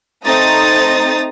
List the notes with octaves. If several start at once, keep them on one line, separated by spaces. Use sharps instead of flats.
A3 C4 D#4 A#5 D#6 A6